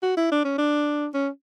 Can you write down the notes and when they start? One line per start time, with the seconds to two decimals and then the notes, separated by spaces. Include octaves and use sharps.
0.03 F#4
0.17 E4
0.31 D4
0.45 C#4
0.58 D4
1.14 C#4